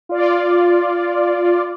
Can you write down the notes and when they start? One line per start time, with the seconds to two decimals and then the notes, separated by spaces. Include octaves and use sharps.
0.09 F4 D5